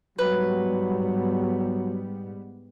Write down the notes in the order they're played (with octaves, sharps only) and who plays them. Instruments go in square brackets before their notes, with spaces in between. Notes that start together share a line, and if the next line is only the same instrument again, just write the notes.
[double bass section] G#2 G3 B3 [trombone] F#3 [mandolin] B4